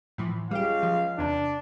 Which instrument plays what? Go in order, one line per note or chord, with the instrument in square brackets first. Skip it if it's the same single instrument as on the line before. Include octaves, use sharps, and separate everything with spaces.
[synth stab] A2 E3 F3
[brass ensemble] C#2 F5 [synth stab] G3 G4
[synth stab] F3
[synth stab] E2 C3 [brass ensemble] D4